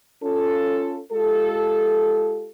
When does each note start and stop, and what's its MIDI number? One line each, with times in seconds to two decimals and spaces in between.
0.23 1.00 61
0.23 1.00 65
0.23 1.00 69
1.12 2.51 56
1.12 2.51 65
1.12 2.51 67
1.12 2.51 69